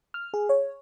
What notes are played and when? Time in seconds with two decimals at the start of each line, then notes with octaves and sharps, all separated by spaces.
0.14 F6
0.34 G#4
0.49 C#5